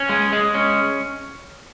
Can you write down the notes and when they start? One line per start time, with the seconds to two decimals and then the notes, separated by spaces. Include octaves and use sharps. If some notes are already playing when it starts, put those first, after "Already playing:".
Already playing: C#4
0.09 G#3
0.33 G#3
0.54 C#4